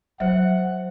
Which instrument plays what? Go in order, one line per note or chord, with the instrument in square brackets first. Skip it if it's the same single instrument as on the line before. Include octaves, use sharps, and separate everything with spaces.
[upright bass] F#3 [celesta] C5 E5 [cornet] F#5